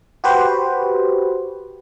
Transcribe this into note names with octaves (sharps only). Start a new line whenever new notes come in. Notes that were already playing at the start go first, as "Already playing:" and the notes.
F#4 G4 B4 C5